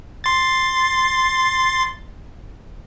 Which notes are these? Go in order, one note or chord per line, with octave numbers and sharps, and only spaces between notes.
C6 A6